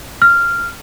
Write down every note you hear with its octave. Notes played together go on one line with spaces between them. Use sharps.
F6